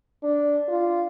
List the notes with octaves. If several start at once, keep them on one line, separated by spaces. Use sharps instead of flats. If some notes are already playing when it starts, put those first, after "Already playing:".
D4
F4